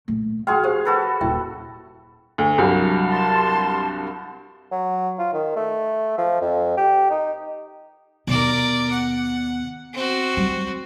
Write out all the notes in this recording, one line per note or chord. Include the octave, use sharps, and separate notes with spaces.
A#2 A3
F3 E4 F#4 G#4 F5 G5 C6
G4 G#4 C5 F5
F#4 A4 B4
D#1 A#2 E4 E5 G5
D2
C2 G2 F#3
A5 C6
F#3
F4
D#3
A3
F3
F2
G4
D#4
D#2 B2 A#4 D5
F#5
C4 F#4
G3